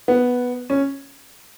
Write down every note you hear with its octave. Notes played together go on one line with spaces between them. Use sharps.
B3
C#4